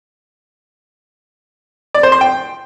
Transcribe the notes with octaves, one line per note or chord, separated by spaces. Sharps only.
D5
C5
C6
G5